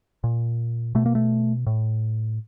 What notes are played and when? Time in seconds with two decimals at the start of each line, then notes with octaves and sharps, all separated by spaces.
0.24 A#2
0.95 B2 A3
1.06 A#3
1.15 A3
1.67 A2